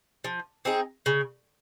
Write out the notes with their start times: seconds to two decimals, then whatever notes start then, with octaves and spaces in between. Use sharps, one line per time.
0.24 F3
0.65 C4 D#4 G#4
1.06 C#3